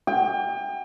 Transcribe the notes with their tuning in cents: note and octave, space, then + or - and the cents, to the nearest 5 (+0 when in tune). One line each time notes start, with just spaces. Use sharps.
G5 +35